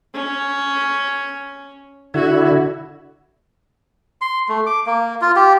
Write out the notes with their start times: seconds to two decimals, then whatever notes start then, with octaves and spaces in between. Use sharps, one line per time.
0.14 C#4
2.14 D3 E4 F#4
4.21 C6
4.49 A3
4.66 D6
4.86 A#3
5.21 F4
5.36 G4